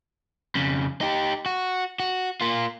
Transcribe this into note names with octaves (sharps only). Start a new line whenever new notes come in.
F2 C#3
D#4 G4
F#4
F#4
A#3 F4